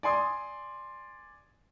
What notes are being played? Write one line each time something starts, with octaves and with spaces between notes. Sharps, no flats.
D5 G#5 C6 D#6